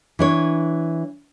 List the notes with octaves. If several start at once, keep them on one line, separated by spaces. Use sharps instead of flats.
E3 D4 C#5